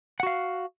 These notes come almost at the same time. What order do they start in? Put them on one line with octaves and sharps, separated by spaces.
F#5 F#4 F5